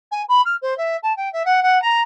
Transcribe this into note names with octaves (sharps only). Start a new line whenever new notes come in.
G#5
B5
F6
C5
E5
A5
G5
E5
F#5
F#5
A#5